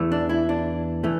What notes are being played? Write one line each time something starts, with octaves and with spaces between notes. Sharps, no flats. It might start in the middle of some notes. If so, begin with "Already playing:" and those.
Already playing: E2 E3 A3
D4
E4
D4
E3 A3